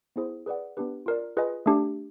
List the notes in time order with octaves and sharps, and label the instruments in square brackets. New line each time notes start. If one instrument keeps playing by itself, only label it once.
[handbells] B3 E4 G#4 C5
G#4 B4 D5 F#5
B3 D4 G4 B4
F4 A#4 D5
F4 G#4 B4 D#5 G#5
A3 D4 G4